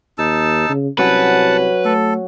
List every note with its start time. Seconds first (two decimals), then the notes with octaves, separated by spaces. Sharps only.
0.18 D#2 D#4 A5 E6
0.70 C#3
0.98 C2 F#3 C#4 B4 F#5 A5
1.85 A3 A4